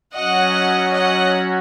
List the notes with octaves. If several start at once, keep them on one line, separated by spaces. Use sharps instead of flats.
F#3 C#4 F#4 D#5 F#5
D#5 F#5